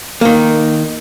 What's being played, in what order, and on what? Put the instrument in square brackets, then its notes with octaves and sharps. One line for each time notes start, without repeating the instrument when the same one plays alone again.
[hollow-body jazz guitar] D#3 A#3